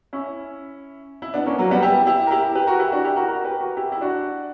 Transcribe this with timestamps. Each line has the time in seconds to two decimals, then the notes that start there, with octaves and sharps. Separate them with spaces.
0.13 C#4 E4
1.22 E4
1.34 B3 D4
1.46 A#3 C#4
1.58 F#3 A#3
1.71 G3 B3
1.82 E4 G4
2.07 E4 G4
2.27 A#4
2.31 E4 G4
2.55 G4 B4
2.67 F#4 A#4
2.79 E4 G4
2.92 D4 F#4
3.04 E4 G4
3.16 F#4 A#4
3.28 F#4 A#4
3.44 G4 B4
3.61 F#4 A#4
3.77 E4 G4
3.92 E4
4.01 D4 F#4